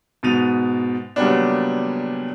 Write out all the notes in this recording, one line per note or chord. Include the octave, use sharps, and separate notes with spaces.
G#2 B2 A6 D#7 F7
A#2 C#3 F#3 G3 B3 D4